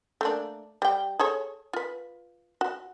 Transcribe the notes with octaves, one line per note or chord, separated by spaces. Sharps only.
A3 A#3 D4
G3 G5
G#4 A4 C#5
F4 B4
F#4